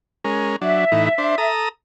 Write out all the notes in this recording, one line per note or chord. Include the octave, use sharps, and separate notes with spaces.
G#3 C#4 A#4
F#3 D4 E5
A2 E3 D#4
D4 C5
A4 A#5 D#6